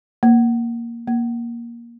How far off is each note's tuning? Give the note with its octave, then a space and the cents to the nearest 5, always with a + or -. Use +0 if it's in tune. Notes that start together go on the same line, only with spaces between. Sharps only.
A#3 +0
A#3 +10